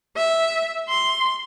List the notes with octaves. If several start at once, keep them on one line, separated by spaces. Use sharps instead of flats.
E5
C6